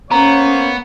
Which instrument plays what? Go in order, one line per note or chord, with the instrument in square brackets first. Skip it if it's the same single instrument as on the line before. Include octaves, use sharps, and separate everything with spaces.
[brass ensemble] A#3 C5 C#5 [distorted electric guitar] B3 [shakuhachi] C#4 [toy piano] A#5